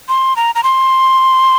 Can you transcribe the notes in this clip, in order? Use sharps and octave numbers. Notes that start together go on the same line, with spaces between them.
C6
A#5
A#5
C6